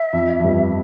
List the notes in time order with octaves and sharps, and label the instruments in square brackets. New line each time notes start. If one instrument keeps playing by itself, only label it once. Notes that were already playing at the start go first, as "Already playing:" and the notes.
Already playing: [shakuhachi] E5
[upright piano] F2
F2
G2